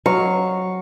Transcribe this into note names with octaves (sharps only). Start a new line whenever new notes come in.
F#3 F5 C#6